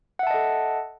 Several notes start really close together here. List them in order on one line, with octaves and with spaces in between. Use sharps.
F#5 E5 A5 D#5 A4